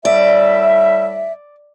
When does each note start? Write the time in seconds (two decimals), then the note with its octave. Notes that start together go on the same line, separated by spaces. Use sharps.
0.05 A2 G3 D5 E5